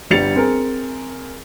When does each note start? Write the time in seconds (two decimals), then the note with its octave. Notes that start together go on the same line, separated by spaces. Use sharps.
0.10 G1 G3 A6 C#7 F7
0.35 C4 G#4 A#4